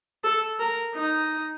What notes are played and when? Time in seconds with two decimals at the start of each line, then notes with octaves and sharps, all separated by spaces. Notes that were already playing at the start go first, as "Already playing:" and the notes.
0.24 A4
0.60 A#4
0.95 D#4